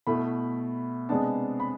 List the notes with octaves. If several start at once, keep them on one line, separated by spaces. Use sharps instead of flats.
B2 A3 E4 B5
C3 G#3 B3 D4 A5
B5